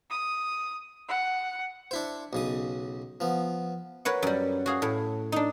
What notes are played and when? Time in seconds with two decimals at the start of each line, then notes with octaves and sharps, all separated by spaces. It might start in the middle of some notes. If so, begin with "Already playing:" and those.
0.10 D#6
1.08 F#5
1.91 D4 E4 C5
2.33 B1 C#3 D#6
3.20 F3 B3
4.05 A#4 B4 C#5 F#5
4.23 F#2 G3
4.66 F#4 G#4 F5
4.82 A2
5.32 D4 D#4